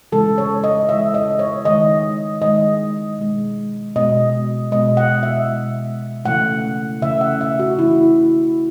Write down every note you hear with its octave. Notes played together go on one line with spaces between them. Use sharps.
C#3 E3 G#3 A4
C#5
D#5
C#3 E3 G#3 E5
D#5
C#5
D#3 G#3 D#5
D#3 G#3 D#5
B2 G#3
B2 G#3 D#5
B2 G#3 D#5
F#5
E5
B2 G#3
C#3 E3 A3 F#5
C#3 E3 A3 E5
F#5
E5
F#4
C#3 E3 A3 E4